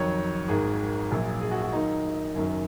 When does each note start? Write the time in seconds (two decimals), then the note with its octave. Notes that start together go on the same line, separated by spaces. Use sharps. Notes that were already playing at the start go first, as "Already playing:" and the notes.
Already playing: F2 D#3 F#3 C#5
0.48 G#1 G#2 D#3 G#4
1.11 A#1 A#2 F#3
1.41 G#4
1.51 F#4
1.62 F#4
1.72 D#2 D#3 F#3 D#4
2.34 F#1 F#2 D#3 F#3